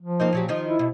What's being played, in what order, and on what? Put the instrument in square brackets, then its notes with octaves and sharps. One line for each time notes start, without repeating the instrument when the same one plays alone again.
[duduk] F3
[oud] A#3 C4 D#4
A#2 F#3 G4
D#3 F3 D#4
[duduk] E4
[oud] B2